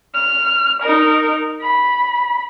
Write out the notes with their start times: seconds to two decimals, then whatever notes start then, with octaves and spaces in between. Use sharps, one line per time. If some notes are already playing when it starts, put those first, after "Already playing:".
0.15 F6
0.82 D#4 A#4
1.62 B5